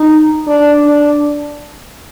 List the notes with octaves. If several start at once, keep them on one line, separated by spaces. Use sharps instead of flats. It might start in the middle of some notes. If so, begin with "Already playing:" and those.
Already playing: D#4
D4
D4